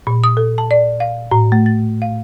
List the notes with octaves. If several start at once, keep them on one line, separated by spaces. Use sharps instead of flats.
A#2
D#6
A4
A5
D5
F5
A2
A3
A6
F5